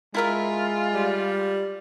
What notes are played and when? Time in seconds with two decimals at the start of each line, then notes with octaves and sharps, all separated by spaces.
0.14 G#3 E4 F4 A#4 E5
0.94 G3